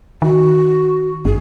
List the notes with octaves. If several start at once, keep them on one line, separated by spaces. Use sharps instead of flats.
D#3 F#4
G1 G#4